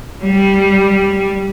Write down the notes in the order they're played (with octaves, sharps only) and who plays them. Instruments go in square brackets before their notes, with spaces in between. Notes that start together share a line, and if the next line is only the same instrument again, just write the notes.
[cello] G3